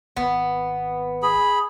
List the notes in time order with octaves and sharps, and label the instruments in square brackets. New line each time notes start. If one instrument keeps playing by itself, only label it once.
[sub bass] G#1 [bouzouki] B3
[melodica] G#4 B5